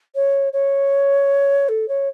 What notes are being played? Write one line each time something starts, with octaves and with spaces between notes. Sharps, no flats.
C#5
C#5
A4
C#5